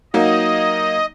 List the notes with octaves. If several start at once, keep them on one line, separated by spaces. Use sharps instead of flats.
F#3 A#3 D#4 D#5